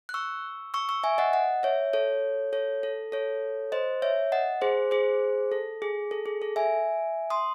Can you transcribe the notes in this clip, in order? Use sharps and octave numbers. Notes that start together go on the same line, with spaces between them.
F#6
C#6 E6
C#6 E6
C#6 E6
E5 G#5
D#5 F#5
D#5 F#5
C#5 E5
A4 C#5
A4 C#5
A4
A4 C#5
C5 D#5
C#5 E5
D#5 F#5
G#4 C5
G#4 C5
A4
G#4
A4
G#4
A4
E5 G#5
C6 D#6